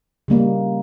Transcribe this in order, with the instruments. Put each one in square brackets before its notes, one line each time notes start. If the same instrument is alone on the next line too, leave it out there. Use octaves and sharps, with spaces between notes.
[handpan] C#3 G3 A#3